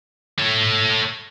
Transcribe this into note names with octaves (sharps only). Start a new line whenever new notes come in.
A3 C#5